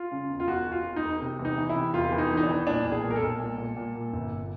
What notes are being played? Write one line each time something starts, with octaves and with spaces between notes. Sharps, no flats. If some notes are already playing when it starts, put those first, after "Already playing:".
Already playing: F4
C#3
E1
F4
E1 F#4
E1
F4
E1
D#4
E1
C3
E2
D#4
E3
E4
C3
E1 F4
E3
D#4
E2
D#4
D4
E3
A#2 D4
B1
G#4
A#2
A#4
A4
B1
A#2
A#2
A#2
A#2
G1
G1